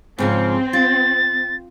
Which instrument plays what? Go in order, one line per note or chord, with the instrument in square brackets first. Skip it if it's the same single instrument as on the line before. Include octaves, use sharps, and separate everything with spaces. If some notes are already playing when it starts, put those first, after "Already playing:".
[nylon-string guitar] G#2 C#3 F3 [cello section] C4
[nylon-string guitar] F4 [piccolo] A6